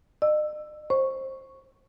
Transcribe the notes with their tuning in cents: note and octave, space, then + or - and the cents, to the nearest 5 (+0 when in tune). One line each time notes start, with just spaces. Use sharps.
D#5 -40 E6 +0
C5 +20 C#6 +0